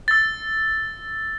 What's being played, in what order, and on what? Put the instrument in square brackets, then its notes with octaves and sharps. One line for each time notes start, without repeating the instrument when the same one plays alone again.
[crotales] E6 A6